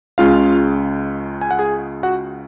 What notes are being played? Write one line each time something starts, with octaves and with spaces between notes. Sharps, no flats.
C#2 C#3 G#3 C#4 F4 F5
G#5
F#5
G#4 G#5
F#4 F#5